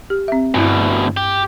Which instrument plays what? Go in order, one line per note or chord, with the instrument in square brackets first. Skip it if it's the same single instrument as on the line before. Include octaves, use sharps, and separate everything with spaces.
[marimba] G4
C4 E5
[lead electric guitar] D2 B2 [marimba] G2 E4
[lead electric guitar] G4